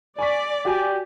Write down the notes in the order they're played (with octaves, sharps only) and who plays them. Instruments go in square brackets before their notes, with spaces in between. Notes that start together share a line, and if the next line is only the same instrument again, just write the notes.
[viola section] D5 [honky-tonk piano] G#5 C#6 B6
[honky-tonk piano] F#4 G#5 [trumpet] G4